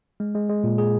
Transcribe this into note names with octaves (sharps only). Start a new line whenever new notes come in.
G#3
G#3
G#3
A#2
G#4